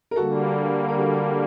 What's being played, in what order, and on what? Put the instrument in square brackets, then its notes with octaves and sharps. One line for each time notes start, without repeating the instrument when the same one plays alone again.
[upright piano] A#4
[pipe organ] D3 G3 A#3 [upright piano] F#4 A4
[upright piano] A#4
F#4 A4